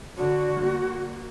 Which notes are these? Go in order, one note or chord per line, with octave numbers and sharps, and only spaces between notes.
D3 F#4
A#3